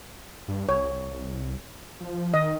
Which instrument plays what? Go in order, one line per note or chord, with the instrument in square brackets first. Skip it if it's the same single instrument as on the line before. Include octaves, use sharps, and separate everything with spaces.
[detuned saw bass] G2
[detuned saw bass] C2 [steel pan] C#5
[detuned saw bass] F3
[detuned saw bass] D#3 [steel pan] D#5